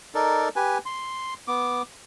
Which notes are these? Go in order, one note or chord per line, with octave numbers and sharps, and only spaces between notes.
D#4 A4 A#4 D5
G4 B4 G#5
C6
B3 D6